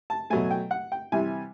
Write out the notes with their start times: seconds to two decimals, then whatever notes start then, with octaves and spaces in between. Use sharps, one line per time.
0.10 A5
0.30 B2 F#3 A3 G#5
0.51 G5
0.71 F#5
0.92 G5
1.12 C3 E3 G3 G#5